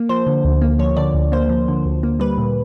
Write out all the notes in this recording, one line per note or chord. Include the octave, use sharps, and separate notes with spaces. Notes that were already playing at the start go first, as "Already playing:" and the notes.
Already playing: A#3
F3 C5
D3
D2
A#3
F3 C#5
D3 D5
D2
A#3 C5
F3
D3
D2
A#3
G3 B4
A#2